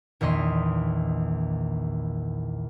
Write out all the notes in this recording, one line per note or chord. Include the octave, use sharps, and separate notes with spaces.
A#1 E2 D#3 D#5 C6 B6